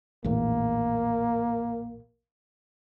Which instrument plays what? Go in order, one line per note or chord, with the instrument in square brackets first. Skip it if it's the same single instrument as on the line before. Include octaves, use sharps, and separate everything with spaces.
[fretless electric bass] A#1 E2 A2 [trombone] A#3